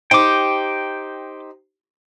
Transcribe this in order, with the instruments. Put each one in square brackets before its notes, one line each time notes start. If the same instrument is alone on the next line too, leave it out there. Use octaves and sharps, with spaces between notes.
[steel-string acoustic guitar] D#4 G4 C5 [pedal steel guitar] G5 D6